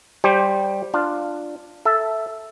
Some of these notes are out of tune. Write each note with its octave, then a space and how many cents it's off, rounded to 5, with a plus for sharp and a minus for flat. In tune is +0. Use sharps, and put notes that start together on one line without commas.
G3 +0 G4 +0 C5 +15
D4 +10 F4 +0
A4 +0 E5 +0